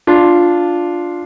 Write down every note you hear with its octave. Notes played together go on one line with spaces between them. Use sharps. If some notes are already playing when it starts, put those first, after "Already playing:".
D4 F4